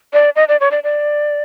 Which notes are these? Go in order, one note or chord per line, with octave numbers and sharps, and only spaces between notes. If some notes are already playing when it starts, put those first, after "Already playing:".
D5
D#5
D5
C#5
D5
D5